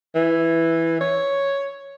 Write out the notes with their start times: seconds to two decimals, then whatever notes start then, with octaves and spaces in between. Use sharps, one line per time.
0.15 E3
1.01 C#5